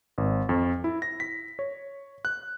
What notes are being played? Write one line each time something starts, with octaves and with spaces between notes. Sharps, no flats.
G#1
F2
E4
A#6
B6
C#5
F#6